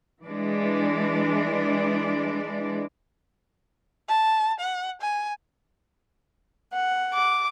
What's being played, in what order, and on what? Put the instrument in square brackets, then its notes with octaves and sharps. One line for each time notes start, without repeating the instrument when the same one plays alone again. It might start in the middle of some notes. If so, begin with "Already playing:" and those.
[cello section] E3 G#3 D4 D5
[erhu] A5
F#5
G#5
[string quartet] F#5
[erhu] D6